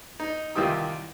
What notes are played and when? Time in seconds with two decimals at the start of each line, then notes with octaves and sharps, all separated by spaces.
0.20 D#4
0.55 C2 D#3 E3 F4 G4 D#6